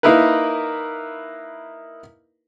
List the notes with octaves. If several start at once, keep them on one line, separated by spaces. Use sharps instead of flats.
A#3 D#4 E4 A#4 B4